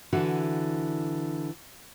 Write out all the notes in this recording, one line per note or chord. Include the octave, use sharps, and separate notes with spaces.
D3 E3 F#4